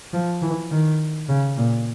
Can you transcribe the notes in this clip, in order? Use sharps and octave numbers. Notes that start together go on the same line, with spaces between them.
F3
E3
D#3
C#3
A#2